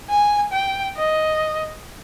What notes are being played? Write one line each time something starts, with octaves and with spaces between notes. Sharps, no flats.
G#5
G5
D#5